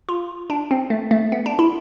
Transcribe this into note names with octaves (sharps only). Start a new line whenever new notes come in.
F4
D4
C4
A3
A3
B3
D4
E4